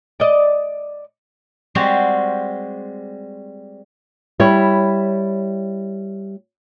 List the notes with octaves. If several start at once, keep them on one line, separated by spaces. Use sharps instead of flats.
D5 D#5
G3 G#3 C4 F#4 G4
G3 E4 C#5